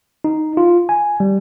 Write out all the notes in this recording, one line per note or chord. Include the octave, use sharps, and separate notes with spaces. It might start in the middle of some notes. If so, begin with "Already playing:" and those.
D#4
F4
G#5
G3